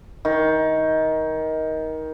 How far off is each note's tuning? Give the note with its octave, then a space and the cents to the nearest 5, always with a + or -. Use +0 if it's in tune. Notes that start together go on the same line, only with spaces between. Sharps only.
D#3 +20